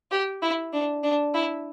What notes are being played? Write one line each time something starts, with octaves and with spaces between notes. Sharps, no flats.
G4
E4
D4
D4
E4